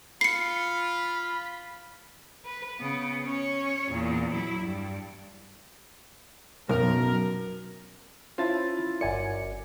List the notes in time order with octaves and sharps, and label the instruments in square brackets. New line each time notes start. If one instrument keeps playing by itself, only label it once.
[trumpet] F4 [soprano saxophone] B5 [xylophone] C7 C#7
[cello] B4
C#3 B3
C#4 C#5
E2 A#2
F#3 E4
G2
[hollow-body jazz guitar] B1 [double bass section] F#2 [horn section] A#4
[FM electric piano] C#4 A6 [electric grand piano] E4 F4 [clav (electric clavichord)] C5 E5 A5
[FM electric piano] G1 G#5 C#7 [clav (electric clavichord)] F#2 [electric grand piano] D5